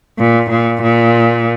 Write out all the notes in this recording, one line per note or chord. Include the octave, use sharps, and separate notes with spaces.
A#2
A#2
A#2